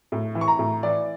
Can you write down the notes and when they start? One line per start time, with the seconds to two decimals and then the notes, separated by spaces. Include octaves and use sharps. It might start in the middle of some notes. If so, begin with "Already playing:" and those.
0.12 A2
0.35 E3
0.41 C#6
0.48 A#5
0.59 A2
0.83 E3 D5